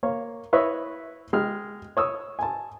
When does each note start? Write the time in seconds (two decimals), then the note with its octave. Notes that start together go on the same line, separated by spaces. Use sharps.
0.03 A#3 C#5 F5
0.53 E4 B4 C#5 D#5 E5
1.33 G#3 G5 F6
1.97 C#5 D#6 E6
2.39 G#5 A5